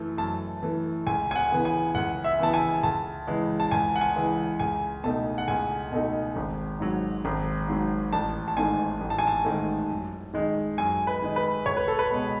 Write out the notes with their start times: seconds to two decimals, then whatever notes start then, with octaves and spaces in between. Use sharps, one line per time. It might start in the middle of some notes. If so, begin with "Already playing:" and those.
Already playing: F#2 E3 A3
0.18 F#2 A5
0.63 E3 A3
1.07 C#2 G#5
1.31 G#5
1.35 F#5
1.51 C#3 E3 B3
1.65 G#5
1.95 C#2 F#5
2.24 E5
2.39 C#3 E3 B3 A5
2.54 G#5
2.83 C#2 A5
3.27 C#3 E3 G#3
3.60 A5
3.71 C#2 G#5
3.96 F#5
4.01 G#5
4.15 C#3 E3 G#3
4.60 C#2 G#5
5.04 B2 A3 D#4 A5
5.38 F#5
5.48 C#2 G#5
5.92 B2 A3 D#4
6.36 G#1
6.80 G#2 F#3
7.25 G#1
7.68 G#2 F#3
8.13 A1 A5
8.48 A5
8.57 G#2 D#3 A3 G#5
9.01 A1
9.10 A5
9.19 G#5
9.27 A5
9.45 G#2 D#3 A3
9.90 F#2
10.34 D#3 G#3 D#4
10.78 F#2 G#5
11.07 B4
11.22 D#3 G#3 D#4
11.36 B4
11.66 C#2 C#5
11.77 B4
11.88 A4
11.99 B4
12.11 B2 G#3 B3